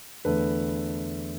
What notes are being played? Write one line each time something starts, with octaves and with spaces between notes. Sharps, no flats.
E2 D3 A3 B4